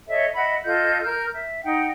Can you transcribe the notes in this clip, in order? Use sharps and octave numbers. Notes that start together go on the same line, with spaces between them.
A4 C#5 D#5 E5
D#5 E5 F#5 B5
F4 A4 D#5 G6
A#4 F6 G6
E5
D#4 F#5 G5